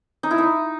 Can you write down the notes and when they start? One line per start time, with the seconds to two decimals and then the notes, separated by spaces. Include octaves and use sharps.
0.23 D#4
0.31 E4
0.38 D#4